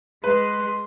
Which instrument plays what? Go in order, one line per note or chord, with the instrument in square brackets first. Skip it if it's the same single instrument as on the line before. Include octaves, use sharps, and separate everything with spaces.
[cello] G#3 [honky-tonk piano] B4 [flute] C6